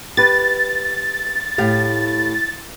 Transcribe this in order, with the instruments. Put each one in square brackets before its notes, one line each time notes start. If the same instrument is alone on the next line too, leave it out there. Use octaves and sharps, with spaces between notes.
[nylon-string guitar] G4 B4 [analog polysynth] A6
[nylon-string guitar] A2 G4 F5